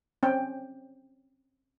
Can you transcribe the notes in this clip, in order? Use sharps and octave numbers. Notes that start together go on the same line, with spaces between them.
C4 C#4 G5